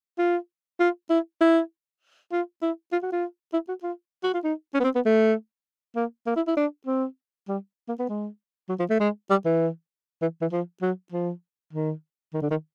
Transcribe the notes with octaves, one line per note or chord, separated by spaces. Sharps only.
F4
F4
E4
E4
F4
E4
F4
F#4
F4
E4
F#4
F4
F#4
F4
D#4
C#4
B3
C4
B3
A3
A#3
A#3
E4
E4
D4
C4
G3
A#3
B3
G#3
F#3
F3
A3
G#3
G3
E3
E3
E3
F3
F#3
F3
D#3
D#3
D3
D#3